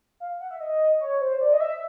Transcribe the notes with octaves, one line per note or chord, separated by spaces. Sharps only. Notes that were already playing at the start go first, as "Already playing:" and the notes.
F5
F#5
E5
D#5
C#5
C5
D5
D#5
E5